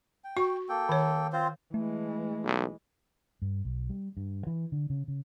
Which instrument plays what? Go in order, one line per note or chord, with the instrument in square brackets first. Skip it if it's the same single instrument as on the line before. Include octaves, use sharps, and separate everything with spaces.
[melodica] G5
[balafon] F#4 C#6
[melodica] A#3 A4 G5
[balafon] D#3 C#5
[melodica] C4 F4 C5
[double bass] E3 G#3 [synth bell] A3
[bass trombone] B1
[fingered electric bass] G2
B1
G3
G2
E3
D3
C#3
C#3